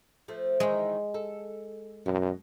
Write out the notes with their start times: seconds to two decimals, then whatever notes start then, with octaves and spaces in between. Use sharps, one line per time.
0.28 F3 A3
0.60 D#3 E3 G#3
1.14 A4
2.06 F#2 B2